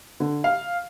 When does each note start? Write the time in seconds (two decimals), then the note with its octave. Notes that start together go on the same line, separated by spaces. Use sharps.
0.20 D3
0.44 F5